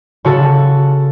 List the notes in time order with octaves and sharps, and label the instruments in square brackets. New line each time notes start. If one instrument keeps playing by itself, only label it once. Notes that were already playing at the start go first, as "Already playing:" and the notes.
[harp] C#3 F#4 A4